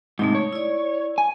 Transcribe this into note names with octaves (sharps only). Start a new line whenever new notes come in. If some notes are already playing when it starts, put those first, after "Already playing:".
G#2 C3 A3 D#4
C#5
E4 D5
G#5